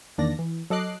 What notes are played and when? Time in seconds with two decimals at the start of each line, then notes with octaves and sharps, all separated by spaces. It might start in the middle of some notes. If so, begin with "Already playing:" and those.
0.18 E2 D#3 A#3 D4 D5 A#6
0.39 E3
0.70 F#3 A4 D#5 D6 F#6 C7